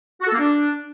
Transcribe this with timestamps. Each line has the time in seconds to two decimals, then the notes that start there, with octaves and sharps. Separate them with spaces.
0.21 F#4
0.27 A4
0.33 A#3
0.39 D4